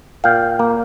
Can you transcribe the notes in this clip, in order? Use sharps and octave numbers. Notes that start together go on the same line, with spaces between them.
A#2 F5 G5
A#3